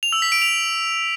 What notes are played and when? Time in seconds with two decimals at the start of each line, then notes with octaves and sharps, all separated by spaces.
0.03 F7
0.12 E6
0.22 B6
0.32 D7
0.42 F7